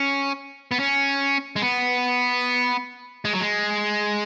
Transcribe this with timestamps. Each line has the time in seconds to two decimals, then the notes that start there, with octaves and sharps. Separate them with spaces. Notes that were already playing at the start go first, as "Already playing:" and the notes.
Already playing: C#4
0.71 B3
0.80 C#4
1.56 G#3
1.62 B3
3.25 G#3
3.33 F#3
3.41 G#3